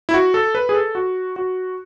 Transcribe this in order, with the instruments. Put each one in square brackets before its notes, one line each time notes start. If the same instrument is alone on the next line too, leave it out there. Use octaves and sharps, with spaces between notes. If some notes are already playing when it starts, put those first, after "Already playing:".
[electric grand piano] E4
F#4
A4
B4
G#4
A4
F#4
F#4